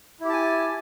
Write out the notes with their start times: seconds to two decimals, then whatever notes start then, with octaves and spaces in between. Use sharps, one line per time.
0.20 E4
0.25 G4
0.29 A5
0.33 G#5